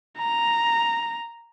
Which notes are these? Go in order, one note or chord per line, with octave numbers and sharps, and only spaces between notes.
A#5